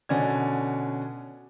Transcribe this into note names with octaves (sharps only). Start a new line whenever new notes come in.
B2 D3 C#4 D4 G#6